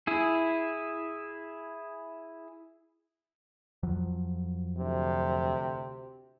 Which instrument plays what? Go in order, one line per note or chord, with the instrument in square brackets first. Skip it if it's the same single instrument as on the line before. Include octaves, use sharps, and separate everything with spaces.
[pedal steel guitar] E4 G#4
[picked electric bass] F2 F3 F#3
[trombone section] D2 C3